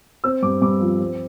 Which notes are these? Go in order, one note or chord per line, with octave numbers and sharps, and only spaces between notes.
C4 E6
G2 D6
G2 D6
F3
C4